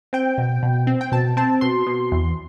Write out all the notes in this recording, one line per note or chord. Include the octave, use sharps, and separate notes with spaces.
C4 G5
B2
B2
C4
G5
B2 A5
C4 A5
B2 C6
B2
E2